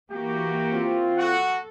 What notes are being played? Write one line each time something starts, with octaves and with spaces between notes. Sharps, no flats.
E3 A#3 F#4 G4
C4 F4
F#4 A4 F#5